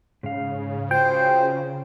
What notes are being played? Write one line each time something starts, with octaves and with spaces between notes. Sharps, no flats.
G#2 C#3 F5
F4 F#4 C5 G5